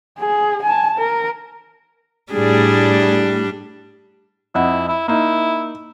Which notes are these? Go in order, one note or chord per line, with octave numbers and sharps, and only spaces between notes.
G#4
G#5 A5
A#4
A2 G3 D4 G#4
F2 E4 D#5 F#5
E4
A#3 D#4 E4